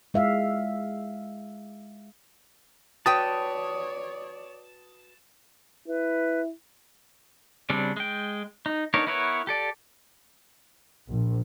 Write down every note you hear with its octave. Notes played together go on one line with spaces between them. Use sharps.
G#3 E5 F5
F#4 B4 C#5 D5 G5 A5 D#6
E4 B4
C#3 G3 C4 D4
G#3 G5
D#4
B3 D4 D#4 A#4 C#5
B3 E4 A#4 B4 C#5
G4 A4 D5
A#1